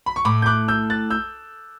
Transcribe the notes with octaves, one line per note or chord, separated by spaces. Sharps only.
B5
C#6
A2 B5 D6
G6
D6 F#6
E6 G6
F#6 A6
E6 G6